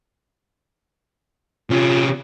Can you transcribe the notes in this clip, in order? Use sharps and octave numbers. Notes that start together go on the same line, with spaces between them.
C3 C#4 F4